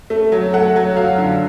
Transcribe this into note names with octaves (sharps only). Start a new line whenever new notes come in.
A3
F#3
A3 F#5
F#3
F#3 F5
D3